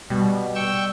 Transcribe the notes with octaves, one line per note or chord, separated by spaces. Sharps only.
B2 G3
G5 C#6 E6